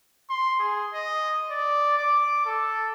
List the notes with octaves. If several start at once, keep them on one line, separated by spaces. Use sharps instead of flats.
C6
G#4
D#5
D5
D6
A4